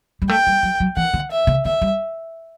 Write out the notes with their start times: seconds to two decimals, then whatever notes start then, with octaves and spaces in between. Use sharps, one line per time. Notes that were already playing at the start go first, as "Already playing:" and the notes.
0.22 G3
0.29 A3 G5
0.47 G3
0.63 F#3
0.80 F#3
0.96 E3 F#5
1.14 D3
1.31 E5
1.47 C#3
1.65 D3 E5
1.82 G3